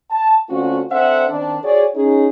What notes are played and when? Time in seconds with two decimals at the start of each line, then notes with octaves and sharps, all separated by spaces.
0.11 A5
0.49 D3 A3 C4 C#4 F4 F#4
0.91 C4 D4 A4 C5 E5 F#5
1.29 D#3 C4 D4
1.63 F#4 G#4 C#5 D5
1.95 C#4 D#4 G#4